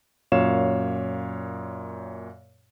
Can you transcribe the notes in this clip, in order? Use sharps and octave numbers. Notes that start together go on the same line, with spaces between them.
F#2 A#2 C#5 F5 E7